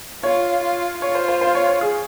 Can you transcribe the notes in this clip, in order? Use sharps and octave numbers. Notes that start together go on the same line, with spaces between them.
F4 C#5
F4
F4 C#5
C5
C5
C5
C#5
C#5
G#4